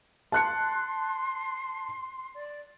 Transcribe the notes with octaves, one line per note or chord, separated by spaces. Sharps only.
A5 C6 F#6 C#7
D5